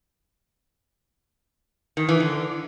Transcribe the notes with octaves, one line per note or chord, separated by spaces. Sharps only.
D#3
E3
D3